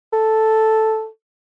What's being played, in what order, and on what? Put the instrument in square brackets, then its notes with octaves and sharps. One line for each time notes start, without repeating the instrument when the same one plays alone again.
[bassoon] A4